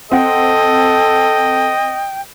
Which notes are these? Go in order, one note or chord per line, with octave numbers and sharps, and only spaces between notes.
C4 A4 D#5 F#5 G5